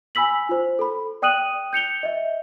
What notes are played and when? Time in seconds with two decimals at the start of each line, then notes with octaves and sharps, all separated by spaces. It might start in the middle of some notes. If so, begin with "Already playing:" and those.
0.15 G#5 B5 E6 B6 F#7
0.49 F4 C5
0.79 A4 B5
1.22 D5 G5 D#6 F#6 D#7 F#7
1.73 G6 C#7 F7 G7
2.03 D#5 E5